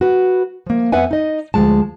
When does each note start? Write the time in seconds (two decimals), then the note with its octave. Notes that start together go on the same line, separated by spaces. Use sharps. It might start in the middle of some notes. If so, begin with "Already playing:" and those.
0.01 F#4 B4
0.66 F3 A#3
0.92 F2 B3 B4 E5 F#5 G#5
1.11 D#4 D#5
1.54 D2 F3 G#3 A5